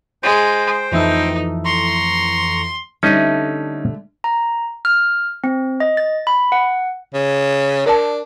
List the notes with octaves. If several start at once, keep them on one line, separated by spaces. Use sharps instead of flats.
G#3 C5 G5
F2 E3 A3 D#4
A#5 C6 C#6
D3 G3 A3 C#4 D#4 D#5
A#5
F6
C4
D#5
A6
B5
F#5
C#3
D4 A#4 D5 A5